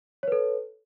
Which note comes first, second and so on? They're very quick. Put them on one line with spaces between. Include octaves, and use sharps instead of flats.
C#5 B4 A4